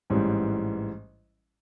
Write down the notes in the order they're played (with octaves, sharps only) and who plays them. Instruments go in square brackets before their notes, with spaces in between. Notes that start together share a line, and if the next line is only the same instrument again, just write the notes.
[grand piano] A1 G#2 E3 G3